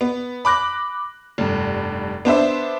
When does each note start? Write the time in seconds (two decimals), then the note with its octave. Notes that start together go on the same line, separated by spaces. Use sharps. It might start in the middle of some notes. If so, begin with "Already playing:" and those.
0.01 B3
0.45 B5 D6 F#6 A#6
1.38 F1 G2
2.25 B3 D4 C5 E5